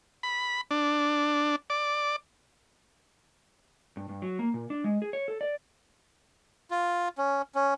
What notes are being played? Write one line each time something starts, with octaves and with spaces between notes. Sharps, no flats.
B5
D4
D5
G2
G2
F#3
A#3
A#2
D4
G#3
G#4
C#5
A4
D5
F4
C#4
C#4